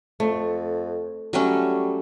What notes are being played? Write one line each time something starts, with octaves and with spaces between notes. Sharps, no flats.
F2 A3
F#3 G3 A3 C#4